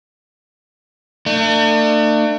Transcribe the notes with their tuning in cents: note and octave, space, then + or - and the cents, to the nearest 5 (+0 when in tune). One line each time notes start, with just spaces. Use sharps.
A3 +45 D4 +40